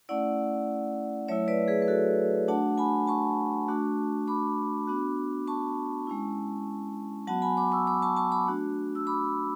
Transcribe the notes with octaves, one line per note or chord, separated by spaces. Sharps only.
A3 C#4 E4 D5 F#5
F#3 A3 E4 C#5 E5
B4 D5
G#4 B4
B4
F#4 A4
A3 D4 F#4 F#5 A5
G#5 B5
A5 C#6
A3 D4 F#4
B5 D6
B3 D4 F#4
A5 C#6
G#3 C#4 E4
F#3 B3 F#4 F#5 A5
G#5 B5
B5 D6
C#6 E6
B5 D6
A5 C#6
A5 C#6
B5 D6
A3 D4 F#4
E6
B5 D6